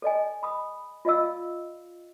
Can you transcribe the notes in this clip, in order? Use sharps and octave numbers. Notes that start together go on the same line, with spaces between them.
A4 D5 D#5 G#5
B5 D#6
F4 D5 D#5 F5 E6